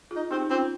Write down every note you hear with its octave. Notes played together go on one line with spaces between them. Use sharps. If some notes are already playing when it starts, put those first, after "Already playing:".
F4 G#4
D#4
C4 D#4 G4
D#4
C4 C#4 F4